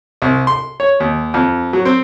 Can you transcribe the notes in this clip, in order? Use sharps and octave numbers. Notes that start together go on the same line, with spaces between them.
C2
C6
C#5
D#2
F2
F#3
C4